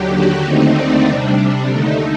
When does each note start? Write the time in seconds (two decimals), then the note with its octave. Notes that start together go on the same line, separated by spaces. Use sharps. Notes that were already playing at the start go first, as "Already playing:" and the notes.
Already playing: D#2 D3 F#3 G4
0.11 F#4
0.42 D#2 D3 A3 C4 D#4
0.74 D4
1.05 C3 G3 D4
1.69 D#2 D3 A3 D#4